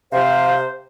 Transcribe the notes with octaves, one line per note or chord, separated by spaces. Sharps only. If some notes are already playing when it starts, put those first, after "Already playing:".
C3 C5 F5